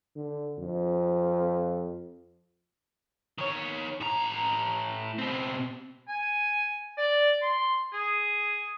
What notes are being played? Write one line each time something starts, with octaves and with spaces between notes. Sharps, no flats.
D3
F2
D#3 C#5
A2 A#5
B2 C4
G#5
D5
C6
G#4